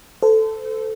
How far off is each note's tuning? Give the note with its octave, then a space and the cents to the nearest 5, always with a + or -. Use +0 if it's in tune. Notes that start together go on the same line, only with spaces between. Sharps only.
A4 +0 C5 -35